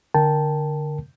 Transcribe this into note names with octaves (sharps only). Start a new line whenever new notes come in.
D3 A#4 G5 A5